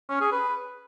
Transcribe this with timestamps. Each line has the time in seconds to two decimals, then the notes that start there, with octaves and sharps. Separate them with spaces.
0.09 C#4
0.21 G#4
0.32 B4